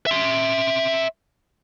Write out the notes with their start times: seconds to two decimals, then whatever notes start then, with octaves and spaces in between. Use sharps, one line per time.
0.07 E5 C6